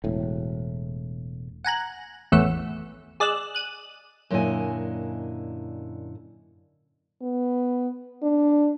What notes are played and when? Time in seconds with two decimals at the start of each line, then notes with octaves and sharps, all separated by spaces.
0.04 E1 A2
1.64 F#5 G#5 A#5 F#6
2.32 A1 E2 A2 A3 F#5 E6
3.20 G#4 D5 D#5 E6 F#6
3.55 F#6 D#7
4.30 F#2 A#2 D3 E4 D#5 G#5
7.22 B3
8.23 D4